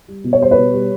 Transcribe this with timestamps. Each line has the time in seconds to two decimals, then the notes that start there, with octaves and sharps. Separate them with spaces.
0.08 G3
0.24 B2
0.33 C#5
0.41 G3 C5
0.51 B4 C#5
0.57 B2
0.74 G3